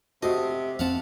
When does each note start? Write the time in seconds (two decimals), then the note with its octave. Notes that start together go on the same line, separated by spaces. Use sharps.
0.23 C3 A3 F#4 D#5
0.79 F2 C4 F5 F#5 A5